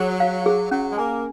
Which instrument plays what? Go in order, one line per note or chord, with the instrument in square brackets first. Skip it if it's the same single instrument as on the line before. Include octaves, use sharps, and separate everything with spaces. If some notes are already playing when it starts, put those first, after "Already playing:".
Already playing: [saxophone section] F#3 [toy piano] G#4
[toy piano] F5
G#4
[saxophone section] F#3 [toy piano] C#4
[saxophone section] G#3
[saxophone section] A#3 [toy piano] G#5